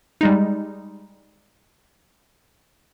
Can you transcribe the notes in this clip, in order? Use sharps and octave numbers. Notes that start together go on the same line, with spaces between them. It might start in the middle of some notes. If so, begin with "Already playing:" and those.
G3 G#3 D#4